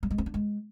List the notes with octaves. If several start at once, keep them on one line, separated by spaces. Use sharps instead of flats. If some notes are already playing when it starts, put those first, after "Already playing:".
G3
G#3
C4
D4
G#3